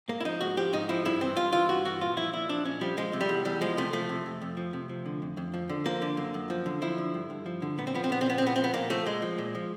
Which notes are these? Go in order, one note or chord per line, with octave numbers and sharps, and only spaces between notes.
G#2 A#3
E4
F3 D#4
G#2 F#4
F3 G4
G#2 D#4
F3 E4
G2 E4
E3 C4
G2 F4
E3 F4
G2 F#4
E3 F#4
A#2 F4
F3 E4
A#2 E4
F3 D4
A#2 C#4
F3 G3
F3 G#3
C3
G3
E2
E2 G3
F3 G#3
C3 A3
F3 A3
C3
F2
F2
F3
C3
F3
D3
F2
F2
F3
D3
F3 A#3
D3
F#2
F#2
F3
D3
F3 E4
D3
G2
G2
F3
D3
A#2 B3
C4
F3 B3
C4
A#2 B3
C4
F3 B3
C4
A#2 B3
F3 C4
B3
A#2 A#3
F3 A3
A#2 G#3
F3
A#2
F3